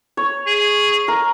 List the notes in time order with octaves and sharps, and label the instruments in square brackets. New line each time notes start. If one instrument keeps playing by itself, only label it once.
[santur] C#5
[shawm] G#4
[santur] A#4